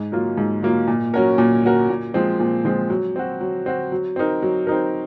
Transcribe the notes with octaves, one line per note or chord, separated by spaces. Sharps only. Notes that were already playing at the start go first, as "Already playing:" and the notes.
Already playing: G#2
F#3 A#3 F4
G#2
F#3 A#3 F4
A#2
F#3 C#4 F#4 A#4
A#2
F#3 C#4 F#4 A#4
A#2
F3 G#3 C4
A#2
F3 G#3 C4
F#3
C4 F#4
F#3
C4 F#4
F#3
C4 D#4 A#4
F#3
C4 D#4 A#4